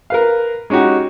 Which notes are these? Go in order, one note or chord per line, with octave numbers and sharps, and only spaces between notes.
A#4 B4 F5
G#3 C#4 D#4 F#4 G4